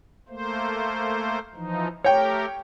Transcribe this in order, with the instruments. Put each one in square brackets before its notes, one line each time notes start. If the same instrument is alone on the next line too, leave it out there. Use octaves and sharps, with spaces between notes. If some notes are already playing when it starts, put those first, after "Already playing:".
[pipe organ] A3 A#3 C5
E3 F3 D#4
[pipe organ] A3 G4 A#4 [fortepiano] C#5 G5